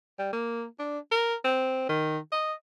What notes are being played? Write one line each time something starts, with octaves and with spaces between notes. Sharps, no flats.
G3
A#3
D4
A#4
C4
D#3
D#5